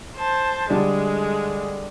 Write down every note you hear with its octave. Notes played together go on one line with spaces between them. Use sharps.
C5 A5
D3 G3 G#3